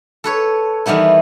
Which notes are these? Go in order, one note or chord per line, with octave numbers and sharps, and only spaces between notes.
A4 B4 C#5
D#3 E3 G3 B3 E4